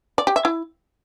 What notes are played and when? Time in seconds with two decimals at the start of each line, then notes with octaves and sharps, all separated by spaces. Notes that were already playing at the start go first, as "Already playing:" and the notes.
0.18 D5
0.27 G4
0.36 E5
0.45 E4